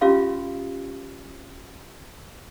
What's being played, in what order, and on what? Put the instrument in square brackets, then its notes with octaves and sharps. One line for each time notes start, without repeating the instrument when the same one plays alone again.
[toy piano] C#4 F4 G4 F5 C6